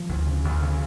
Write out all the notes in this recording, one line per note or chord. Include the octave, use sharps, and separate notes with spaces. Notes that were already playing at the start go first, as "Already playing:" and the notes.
Already playing: F3
D2
C#3
D2
C#3